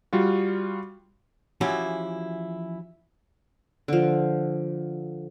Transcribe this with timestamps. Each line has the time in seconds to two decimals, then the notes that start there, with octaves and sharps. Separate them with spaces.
0.13 G3 F4 F#4
1.61 E3 F3 C#4 E4 F#4 G4
3.88 D3 F3